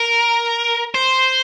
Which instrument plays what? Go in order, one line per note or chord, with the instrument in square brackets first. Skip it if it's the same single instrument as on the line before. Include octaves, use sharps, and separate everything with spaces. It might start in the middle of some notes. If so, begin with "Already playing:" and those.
Already playing: [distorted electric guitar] A#4
C5